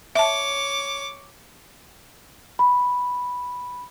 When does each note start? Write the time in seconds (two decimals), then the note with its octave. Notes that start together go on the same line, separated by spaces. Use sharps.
0.15 C#5 E5 A5 D6
2.59 B5